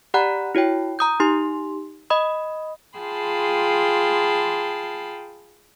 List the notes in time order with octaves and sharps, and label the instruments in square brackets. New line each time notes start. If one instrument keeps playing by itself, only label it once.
[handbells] G4 D5 F#5 A#5 B5 F#6
E4 F#4 C#5 G5
A#5 D#6 G6
D#4 G4 C6
D#5 B5 D#6
[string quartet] F4 G#4 G5 A5 B5 C6